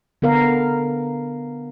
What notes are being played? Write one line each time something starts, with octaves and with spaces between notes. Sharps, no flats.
D3 B3 A#4 F5